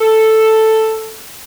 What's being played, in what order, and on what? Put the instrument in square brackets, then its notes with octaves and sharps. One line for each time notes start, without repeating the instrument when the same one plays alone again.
[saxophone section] A4